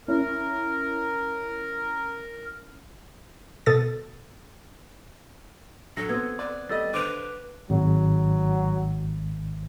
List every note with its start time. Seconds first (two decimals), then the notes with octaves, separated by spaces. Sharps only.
0.08 C#4 E4 A#4
3.66 B2 A4 D#6 A6
5.97 F#3 D4 A4 A#6
6.09 B3 C4 E6 G#6
6.39 B4 D5
6.69 G3 A3 D#5 E6 A6
6.94 D3 B4 C5 D6 D7 F7
7.70 G#1 F#3